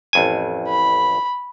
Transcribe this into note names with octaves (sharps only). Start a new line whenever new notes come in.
A1 F2 G#5
B5